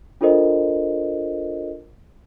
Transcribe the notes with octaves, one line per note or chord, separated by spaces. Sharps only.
D4 F4 A4 A#4 C5 D#5